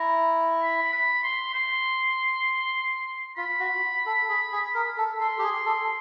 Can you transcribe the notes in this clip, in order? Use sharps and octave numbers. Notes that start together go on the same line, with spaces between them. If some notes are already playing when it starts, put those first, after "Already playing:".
Already playing: E4 A#5
B5
B5
C6
C6
F4 B5
F#4
A4
G#4
G#4
A#4
A4
A4 C6
G4
G#4
A4